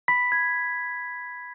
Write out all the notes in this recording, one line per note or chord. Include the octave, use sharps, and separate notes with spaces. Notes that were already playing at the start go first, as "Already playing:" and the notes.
B5 B6
G#6